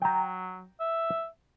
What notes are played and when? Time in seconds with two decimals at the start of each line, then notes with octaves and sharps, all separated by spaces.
0.02 F#3 G5 A#5
0.80 E5